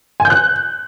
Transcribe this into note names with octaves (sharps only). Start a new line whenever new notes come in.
G#5
G6
F#6